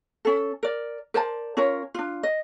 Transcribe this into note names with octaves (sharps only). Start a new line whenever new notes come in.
C#4 A4
A#4 D5
A#4 C5 D5 A5
C#4 F4 A#4 C#5
D4 F4
D#5